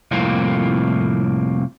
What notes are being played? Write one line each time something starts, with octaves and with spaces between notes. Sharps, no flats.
C2 F2 A2 A#3 C4